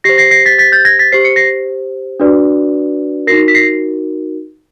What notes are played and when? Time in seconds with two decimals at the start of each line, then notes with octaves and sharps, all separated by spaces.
0.04 G4 A#6 C7
0.09 C5
0.18 A#6 C7
0.31 A#6 C7
0.46 A6 B6
0.58 A6 B6
0.72 G6 A6
0.85 G#6 A#6
0.99 A6 B6
1.12 G4 C5 C7
1.24 C#7
1.36 A#6 C7
2.20 D4 F#4 B4 D5
3.27 D#4 F#4 A#4 A#6 C7
3.48 B6
3.55 A#6 C7